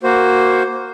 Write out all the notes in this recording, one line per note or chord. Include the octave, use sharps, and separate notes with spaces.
A#3 F#4 C5